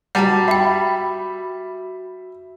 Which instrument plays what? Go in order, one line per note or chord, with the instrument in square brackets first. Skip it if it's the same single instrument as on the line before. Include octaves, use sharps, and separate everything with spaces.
[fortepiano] G3 [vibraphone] F#4 [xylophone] F#5 A5 A#5
[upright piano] E5 B5 [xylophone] G5 C7